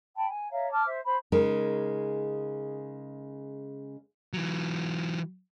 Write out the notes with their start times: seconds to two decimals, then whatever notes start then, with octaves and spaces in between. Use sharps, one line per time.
0.15 G5 A5 B5
0.29 G#5
0.50 C#5 E5 F5 A#5
0.70 A5 D6 F6
0.86 C5 E5
1.04 C5 B5
1.32 C#3 G#3 D#4 A#4
4.33 E3 F#3